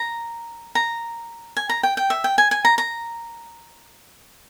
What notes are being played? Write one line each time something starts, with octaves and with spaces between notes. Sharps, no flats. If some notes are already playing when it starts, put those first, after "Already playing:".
Already playing: A#5
A#5
G#5
A#5
G5
G5
E5
G5
G#5
G#5
A#5
A#5